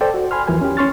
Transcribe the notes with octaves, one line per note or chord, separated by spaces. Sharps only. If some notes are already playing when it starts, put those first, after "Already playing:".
A4 C5 D5 G5 A5
F#4
G#5 B5 C6 F6
E2 E3 F3 A#4 G#5
C#4 G4
C#4 C6 C#6 F6 A6